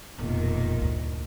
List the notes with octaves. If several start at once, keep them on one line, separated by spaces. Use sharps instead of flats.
E1 F2 A#2 D#3
D2 G2